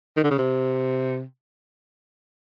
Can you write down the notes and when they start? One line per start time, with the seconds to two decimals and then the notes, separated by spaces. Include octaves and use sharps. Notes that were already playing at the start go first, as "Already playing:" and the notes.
0.17 D#3
0.24 D3
0.31 C#3
0.38 C3